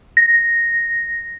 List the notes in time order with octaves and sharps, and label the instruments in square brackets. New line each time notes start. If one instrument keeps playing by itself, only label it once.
[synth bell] A#6